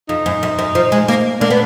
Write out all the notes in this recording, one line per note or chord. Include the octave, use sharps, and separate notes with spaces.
F2 D#4
F#2
F#2
F#2
F3
G#3
A#3
A#3 D4
B3